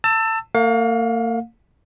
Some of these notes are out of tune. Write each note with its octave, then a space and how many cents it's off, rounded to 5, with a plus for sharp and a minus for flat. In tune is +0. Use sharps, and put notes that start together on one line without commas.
A5 +25 E6 +0
A#3 -40 F5 +30